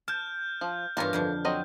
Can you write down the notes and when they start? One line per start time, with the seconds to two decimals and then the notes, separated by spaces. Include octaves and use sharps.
0.08 A5 F6 G6
0.61 F3
0.97 G2 E3 B3 F4 A#4 C#5
1.13 F2 D3 F3
1.45 F#3 C4 D#5